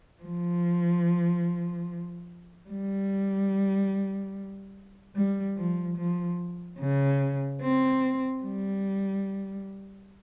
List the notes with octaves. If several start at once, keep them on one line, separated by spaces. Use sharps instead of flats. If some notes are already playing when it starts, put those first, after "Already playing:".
F3
G3
G3
F3
F3
C#3
C4
G3